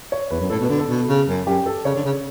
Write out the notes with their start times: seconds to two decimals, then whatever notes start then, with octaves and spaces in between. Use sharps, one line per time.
0.12 C#5
0.31 E2 B4
0.40 F#2
0.50 A2 A4
0.60 B2
0.64 D3 B4
0.78 A4
0.89 B2
1.08 C#3
1.28 F#2
1.47 F#2 G4
1.66 A4
1.85 C#3 C#5
1.95 D3
2.05 C#3